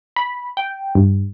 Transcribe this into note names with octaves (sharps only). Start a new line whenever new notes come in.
B5
G5
G2